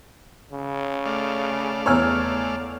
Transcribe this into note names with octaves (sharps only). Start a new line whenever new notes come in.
C#3
A3 D5 F5
E2 C#5 G#5 A#5 E6 F6